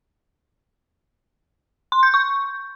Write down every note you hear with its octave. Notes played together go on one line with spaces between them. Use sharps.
C6
G6
C#6